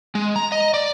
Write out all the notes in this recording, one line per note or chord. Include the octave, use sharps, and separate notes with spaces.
G#3
A#5
D#5
D5